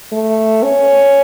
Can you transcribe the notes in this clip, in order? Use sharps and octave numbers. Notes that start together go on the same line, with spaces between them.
A3
C#4